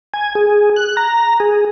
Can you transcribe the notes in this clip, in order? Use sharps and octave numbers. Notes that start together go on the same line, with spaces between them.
G#5
G#4
F#6
A#5
G#4